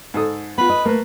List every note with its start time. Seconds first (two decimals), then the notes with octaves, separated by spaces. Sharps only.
0.14 G#2 A4 D#6
0.58 B3 F4 B4
0.69 D#5
0.85 A3 A#3 B4